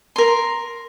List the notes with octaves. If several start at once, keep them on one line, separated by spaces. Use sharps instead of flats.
A#4 C6